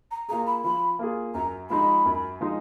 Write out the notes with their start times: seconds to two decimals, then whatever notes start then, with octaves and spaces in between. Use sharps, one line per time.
0.11 A#5
0.28 A#3 F4 G#4 A#5
0.47 B5
0.64 F3 B5
0.99 A#3 F4 G#4
1.34 F#2 A#5
1.70 F3 G#3 D#4 B5
2.05 F#2
2.41 F3 G#3 D#4